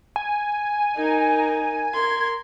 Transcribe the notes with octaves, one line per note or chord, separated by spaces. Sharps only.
G#5
D#4 A#4
A#4 C6 G#6